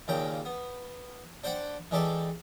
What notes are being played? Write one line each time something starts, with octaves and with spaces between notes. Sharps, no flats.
D#2 A#2 C#3 G5 A#5
B3
D4 C5 D5 F#5 G5
E3 G#3 D4 G4 A4 D5